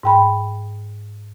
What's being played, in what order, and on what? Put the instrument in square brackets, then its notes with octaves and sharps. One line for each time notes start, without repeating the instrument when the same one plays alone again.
[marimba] G#2 G5 B5